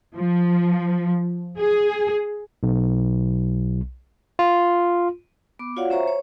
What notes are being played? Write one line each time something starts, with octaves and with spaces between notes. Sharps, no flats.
F3
G#4
B1
F4
B3 D6
F4 F#4 C#5 D5 F5 F#5
C#4 C5 C#5 E5 A#5 C#6
C#5